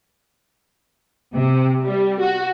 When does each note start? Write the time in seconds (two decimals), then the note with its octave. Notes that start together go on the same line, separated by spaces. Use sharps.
1.34 C3
1.84 G3
2.21 F#4